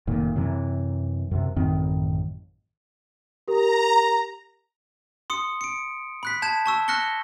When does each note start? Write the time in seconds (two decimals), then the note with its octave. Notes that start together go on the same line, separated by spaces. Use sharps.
0.07 F1 A#2 D#3
0.36 F#2 C3 E3
1.31 F#2 C3
1.56 A1 F#2 D#3 C4
3.48 G4 A#4 A#5
5.30 C6 D#6 C#7
5.61 C#7 D7
6.23 B5 F#6 B6
6.42 A5 G6 G#6 E7
6.66 A5 C#6 E6
6.88 C#6 F6 F#6 A#6 C#7 G7